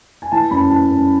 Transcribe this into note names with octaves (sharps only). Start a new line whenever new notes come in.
G#5
E3 A5
F#2 B5
E3 A5
F#2